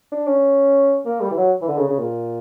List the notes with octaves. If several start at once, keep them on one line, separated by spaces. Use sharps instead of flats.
D4
C#4
A#3
G3
E3
F#3
E3
D3
C#3
C#3
A#2